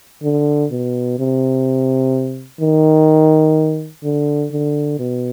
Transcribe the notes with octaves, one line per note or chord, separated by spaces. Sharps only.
D3
B2
C3
D#3
D3
D3
B2